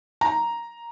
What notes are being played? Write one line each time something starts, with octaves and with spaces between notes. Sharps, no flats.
A#5